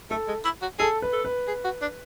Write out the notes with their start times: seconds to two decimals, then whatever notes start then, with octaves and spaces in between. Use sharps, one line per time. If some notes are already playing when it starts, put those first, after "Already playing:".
0.10 A3 A4
0.28 G#3
0.45 E4
0.62 F#4
0.79 G#4 A4
1.02 B4
1.13 A4
1.25 B4
1.48 G#4
1.64 F#4
1.82 D4